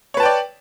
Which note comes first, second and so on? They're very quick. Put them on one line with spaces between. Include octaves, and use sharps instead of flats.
C#5 B4 A5 G5 D5